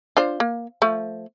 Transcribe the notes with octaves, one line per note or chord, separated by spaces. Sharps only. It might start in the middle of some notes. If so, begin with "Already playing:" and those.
D4 F4 C5
A#3
F3 A3